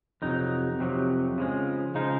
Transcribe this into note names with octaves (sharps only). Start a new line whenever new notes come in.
F2 C3 F#3 D#4
F2 C3 F#3
C#3 F3 G#3
C#3 F3 G#3 D#4